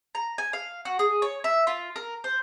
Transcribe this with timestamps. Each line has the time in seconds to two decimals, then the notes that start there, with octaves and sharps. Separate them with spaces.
0.15 A#5
0.38 G#5
0.53 F5
0.85 F#4
0.99 G#4
1.22 C#5
1.44 E5
1.67 F4
1.96 A#4
2.24 C5